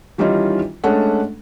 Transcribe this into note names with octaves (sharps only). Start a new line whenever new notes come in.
D#3 E3 G3 C#4 D#4 F4
G#3 A3 C#4 D4 A4 F#5